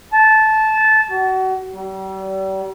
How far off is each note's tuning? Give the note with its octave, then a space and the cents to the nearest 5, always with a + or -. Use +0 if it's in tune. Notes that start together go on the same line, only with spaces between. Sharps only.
A5 -15
F#4 +30
G3 -40